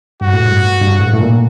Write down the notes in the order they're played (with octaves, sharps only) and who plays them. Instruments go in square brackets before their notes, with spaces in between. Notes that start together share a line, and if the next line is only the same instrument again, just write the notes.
[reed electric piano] G2 [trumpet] F#4
[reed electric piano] A2
G2
G2
A2
A2
A#2